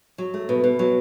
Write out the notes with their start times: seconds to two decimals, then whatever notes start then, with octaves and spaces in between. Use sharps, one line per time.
0.18 F#3
0.34 A3
0.49 B2
0.64 B2
0.79 F#3